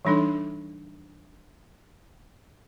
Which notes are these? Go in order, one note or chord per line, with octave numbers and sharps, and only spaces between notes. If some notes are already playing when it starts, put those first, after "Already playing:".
E3 G3 D4 D#4 A4